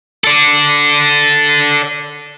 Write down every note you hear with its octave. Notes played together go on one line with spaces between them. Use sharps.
A4 D5